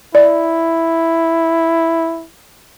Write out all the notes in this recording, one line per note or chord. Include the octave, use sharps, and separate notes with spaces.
E4 D5